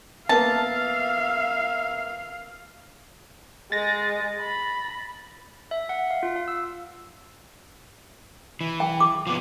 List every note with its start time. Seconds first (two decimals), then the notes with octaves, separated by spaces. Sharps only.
0.29 A#3 B3 E5 F5 A5
3.72 G#3 G#4 A6 A#6
4.40 B5
5.71 E5
5.89 F#5
6.11 F5
6.23 F4
6.36 F5
6.48 E6
8.61 E3
8.80 G5
9.00 D6
9.27 F3 B3